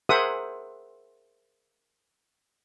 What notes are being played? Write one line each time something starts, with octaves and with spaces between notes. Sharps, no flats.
G#4 A#4 C5 E5 F#5 D#6